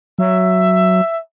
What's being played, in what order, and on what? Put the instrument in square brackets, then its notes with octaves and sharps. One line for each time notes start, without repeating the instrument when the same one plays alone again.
[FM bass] F#3 [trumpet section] E5